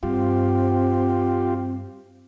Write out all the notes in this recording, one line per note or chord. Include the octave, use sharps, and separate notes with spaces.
G2 C4 F4 G4